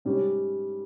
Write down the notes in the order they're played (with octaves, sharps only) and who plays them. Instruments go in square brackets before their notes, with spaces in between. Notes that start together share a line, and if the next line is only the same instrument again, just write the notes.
[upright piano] G#2 G3 C#4 G4 C#5